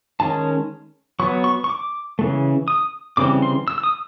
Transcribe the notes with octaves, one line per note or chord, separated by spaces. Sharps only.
D#3 G#3 C#4 A5
F#3 B3 C#6
C#6
C#6
D6
C#3 E3 A3
D#6
C#3 E3 G3 C4 D6
C6
E6
E6
D#6